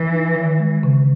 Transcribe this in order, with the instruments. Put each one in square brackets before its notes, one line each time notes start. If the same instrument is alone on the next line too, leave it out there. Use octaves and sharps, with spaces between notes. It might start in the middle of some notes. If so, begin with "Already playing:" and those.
Already playing: [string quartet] E3
[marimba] D#4
D#3
G#3
C#3